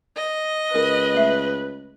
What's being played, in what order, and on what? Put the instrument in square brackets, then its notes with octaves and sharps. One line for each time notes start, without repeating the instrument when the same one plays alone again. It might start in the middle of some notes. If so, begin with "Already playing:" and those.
[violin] D#5
[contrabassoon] C#2 [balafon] A#4 [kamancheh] B4
[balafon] A3 E5